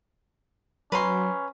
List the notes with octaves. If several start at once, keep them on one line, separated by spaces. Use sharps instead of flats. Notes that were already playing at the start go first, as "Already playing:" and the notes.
F#3 C#4 B4 A#5 C6